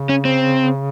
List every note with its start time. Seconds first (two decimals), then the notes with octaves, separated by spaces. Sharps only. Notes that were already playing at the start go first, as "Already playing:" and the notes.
Already playing: C#3
0.09 C#4
0.25 C4